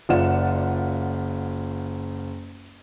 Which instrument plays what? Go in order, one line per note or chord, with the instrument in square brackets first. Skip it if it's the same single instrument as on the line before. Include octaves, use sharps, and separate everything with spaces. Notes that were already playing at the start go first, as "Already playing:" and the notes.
[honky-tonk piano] F#1 F4 D5 F#5 E7